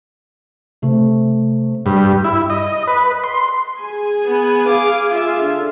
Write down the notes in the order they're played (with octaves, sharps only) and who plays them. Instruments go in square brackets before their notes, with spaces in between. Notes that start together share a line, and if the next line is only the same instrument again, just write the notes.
[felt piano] C3 A3
[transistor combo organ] G2
E4
D#5
B4
C6
[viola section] G#4 G#5
[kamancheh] B3 B4
F5 D6
F4 E5
[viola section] D3